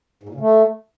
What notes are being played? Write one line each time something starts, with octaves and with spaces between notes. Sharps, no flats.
G#2
A#2
C#3
A3